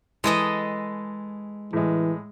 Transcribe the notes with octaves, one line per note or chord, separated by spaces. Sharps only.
E3 G#3 A4 D#5
A2 E3 G#3